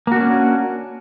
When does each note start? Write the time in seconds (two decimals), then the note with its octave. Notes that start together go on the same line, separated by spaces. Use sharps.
0.07 A#3
0.12 F#4
0.16 D4
0.20 C#4